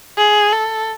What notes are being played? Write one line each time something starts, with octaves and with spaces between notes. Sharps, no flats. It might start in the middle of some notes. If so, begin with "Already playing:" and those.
G#4
A4